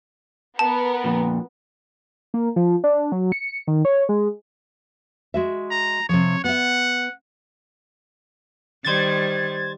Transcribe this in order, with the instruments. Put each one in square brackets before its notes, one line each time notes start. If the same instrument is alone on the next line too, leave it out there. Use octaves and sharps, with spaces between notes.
[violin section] B3 A#4 [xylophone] A5
[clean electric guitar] F2 A#2
[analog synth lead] A#3
F3
D4
F#3
C#7
D#3
C#5
G#3
[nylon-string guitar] G#3 F#4 E5
[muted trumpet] A#5
[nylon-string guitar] C3 F3 [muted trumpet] C#5
[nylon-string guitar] B3 E5 [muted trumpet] F#5
[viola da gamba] D#3 G3 [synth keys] C5 G#6 A6